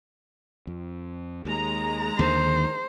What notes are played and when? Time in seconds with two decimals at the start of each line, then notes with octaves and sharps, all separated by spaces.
0.67 F2
1.45 D#2 G#3 A#5
2.19 D#2 D3 D#3 C5